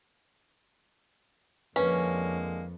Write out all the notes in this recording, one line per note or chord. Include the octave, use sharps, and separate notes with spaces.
F2 D3 G#3 A#3 C#4 B4